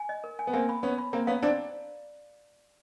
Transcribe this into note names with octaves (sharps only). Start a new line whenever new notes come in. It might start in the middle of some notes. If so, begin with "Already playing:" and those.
Already playing: G#5
D#5
A#4
G#5
B3
A#3 C4 G#5
B5
B3 C#4 B5
B5
A#3 C4 A#5
B3 C#4 F5
C4 D4 D5